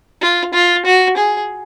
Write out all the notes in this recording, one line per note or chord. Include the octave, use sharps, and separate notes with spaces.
F4
F4
F#4
G#4